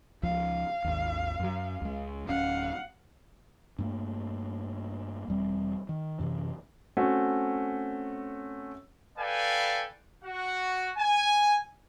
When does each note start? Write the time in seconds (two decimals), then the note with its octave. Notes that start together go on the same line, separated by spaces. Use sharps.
0.23 C#2 F3 F5
0.84 G#1 D#2
1.39 F#2 F#3
1.82 C#2 G#3
2.28 D1 C#4 F5 F#5
3.79 G2 A3 A#3
5.28 E1 G3 C4
5.89 D#3
6.19 F#2 C3 E3
6.97 A3 C4 C#4 F#4
9.17 A4 B4 D5 F5 G5 G#5
10.24 F#4 F#5
10.97 G#5